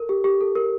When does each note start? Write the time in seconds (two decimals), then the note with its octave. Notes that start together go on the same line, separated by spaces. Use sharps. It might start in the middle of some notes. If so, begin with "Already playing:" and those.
Already playing: A4 A#4
0.09 G4
0.24 G4
0.41 A4
0.55 A#4